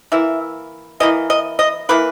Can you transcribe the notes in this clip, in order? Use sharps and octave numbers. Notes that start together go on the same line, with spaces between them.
E3 A#3 E4 E5
E3 A#3 E4 D#5
D#5
D#5
E3 A#3 E4 B4